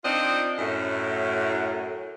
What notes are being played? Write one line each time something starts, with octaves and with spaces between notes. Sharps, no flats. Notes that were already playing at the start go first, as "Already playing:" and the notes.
C4 D4 D#4 F4 D#5
F#2 A2